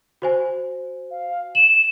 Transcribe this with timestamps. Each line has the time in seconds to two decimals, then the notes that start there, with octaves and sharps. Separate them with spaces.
0.22 F#4 C5 G#5
1.10 F5
1.55 E7 F#7